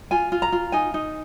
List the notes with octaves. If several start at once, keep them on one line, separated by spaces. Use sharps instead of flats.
F4 G#5
F4
A#5
F4
D#4 G#5
D#4